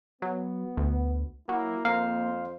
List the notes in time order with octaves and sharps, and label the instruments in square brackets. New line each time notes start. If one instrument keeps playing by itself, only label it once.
[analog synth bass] F#3 [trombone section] B3
[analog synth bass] D2
[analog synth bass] F#3 [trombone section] A#3 E4
[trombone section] F2 C5 [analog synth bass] A#3 [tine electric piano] F5